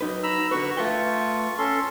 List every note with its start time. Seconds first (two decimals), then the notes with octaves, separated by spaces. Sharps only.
0.01 F#3 D#4 B4
0.23 A#5 B5 E6
0.51 D3 F#4 B4 C#6
0.77 A3 F4 B4 G5 C#6
1.58 C#4 A4 C6